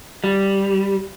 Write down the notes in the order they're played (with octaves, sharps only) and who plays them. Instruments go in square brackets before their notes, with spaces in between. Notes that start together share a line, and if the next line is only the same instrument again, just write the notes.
[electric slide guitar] G3